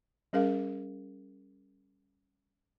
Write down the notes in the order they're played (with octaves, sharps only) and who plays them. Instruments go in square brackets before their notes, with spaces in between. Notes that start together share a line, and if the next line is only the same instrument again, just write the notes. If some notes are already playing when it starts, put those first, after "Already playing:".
[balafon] G3 C#4 G#4 A#4 F5